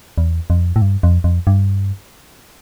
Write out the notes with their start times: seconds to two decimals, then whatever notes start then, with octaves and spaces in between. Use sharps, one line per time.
0.18 E2
0.50 F2
0.76 A2
0.82 G2
1.03 F2
1.24 F2
1.47 G2